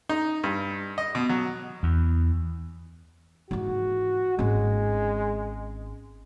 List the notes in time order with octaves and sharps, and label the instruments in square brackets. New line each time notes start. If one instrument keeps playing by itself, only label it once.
[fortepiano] D#4
G2
D#5
B2
F#3
[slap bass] E2
[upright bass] G#2 E3 [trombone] F#4
[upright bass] G#1 C#4 [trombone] G#3